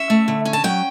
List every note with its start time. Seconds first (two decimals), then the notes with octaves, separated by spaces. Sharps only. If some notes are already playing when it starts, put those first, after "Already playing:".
Already playing: C#4 E5
0.10 A3
0.28 D3
0.45 C#4
0.53 A5
0.64 F#3 G5